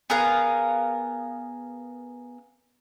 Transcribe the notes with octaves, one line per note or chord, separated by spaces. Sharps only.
B3 G#4 A#4 F5